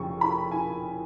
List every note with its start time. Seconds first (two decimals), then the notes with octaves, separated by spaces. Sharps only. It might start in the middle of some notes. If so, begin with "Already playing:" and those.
Already playing: F1 F2 C#3 F3 C#6
0.21 B5
0.51 G#5